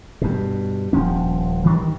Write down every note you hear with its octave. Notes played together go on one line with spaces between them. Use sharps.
G2 B2
D#1 F3 C#4
G2 D#3 E3